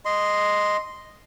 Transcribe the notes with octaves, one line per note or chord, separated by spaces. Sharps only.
D#5 C6